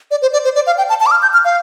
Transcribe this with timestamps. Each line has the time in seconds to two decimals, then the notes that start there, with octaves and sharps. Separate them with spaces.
0.11 D5
0.22 C5
0.33 D5
0.45 C5
0.55 D5
0.67 F5
0.78 G5
0.89 A5
1.00 A5
1.06 D6
1.11 F6
1.22 G6
1.33 F6
1.45 F5